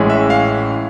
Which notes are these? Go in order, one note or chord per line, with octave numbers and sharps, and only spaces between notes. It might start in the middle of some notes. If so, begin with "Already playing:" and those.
Already playing: A1 A2 E3 G#3 C#4
E5
F5